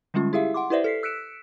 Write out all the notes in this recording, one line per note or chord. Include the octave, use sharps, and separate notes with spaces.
D3 G3 G#3 C#4 F4
E4 G4 G#4 E5 F5
F#5 C6 D6
E4 G4 B4 C5 D5 E5
A4 B6 C7
E6 F#6 B6 C#7 D7 E7